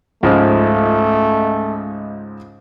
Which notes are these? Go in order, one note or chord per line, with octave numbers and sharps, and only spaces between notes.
C#2 G#2 F3 A3